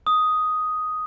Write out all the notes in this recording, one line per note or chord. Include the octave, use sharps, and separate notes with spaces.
D#6